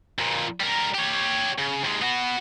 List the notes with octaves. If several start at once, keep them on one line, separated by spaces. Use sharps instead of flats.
F2 A#2
G3 A#4
G4 C#5
C#3
D#2 G#3
B3 F#4